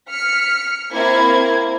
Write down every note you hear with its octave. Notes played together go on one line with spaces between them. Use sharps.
F6 B6 C#7
A#3 C4 E4 G#6